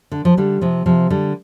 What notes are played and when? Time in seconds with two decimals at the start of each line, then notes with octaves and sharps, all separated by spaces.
0.12 D3
0.25 F3
0.37 D3 G3
0.61 C3 F3
0.86 C3 F3
1.10 D3 G3